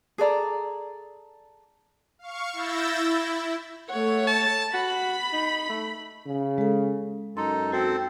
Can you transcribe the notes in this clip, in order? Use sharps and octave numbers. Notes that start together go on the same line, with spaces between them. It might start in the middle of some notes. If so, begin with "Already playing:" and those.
G#4 A4 D5 A#5
F5 C#6
E4 E6 G6 A6 A#6
E4
A3 C#5 F#5
A5
F#4 B5
D#4
A3
C#3
G#3 A4
F#2 D#4 A4 C6
C4 F#4 A4 C5